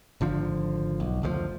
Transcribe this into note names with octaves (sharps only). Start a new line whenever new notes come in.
G#1 D3 F3
B1
F#1 D2 C#3 F3